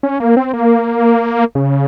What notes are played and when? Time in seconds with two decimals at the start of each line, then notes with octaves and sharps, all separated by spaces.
0.03 C#4
0.20 A#3
0.37 C4
0.53 A#3
1.55 C#3